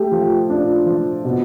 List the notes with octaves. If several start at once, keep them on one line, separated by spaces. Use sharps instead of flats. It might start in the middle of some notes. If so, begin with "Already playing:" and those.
Already playing: A3 G4
F3
D4 F4
F3
B2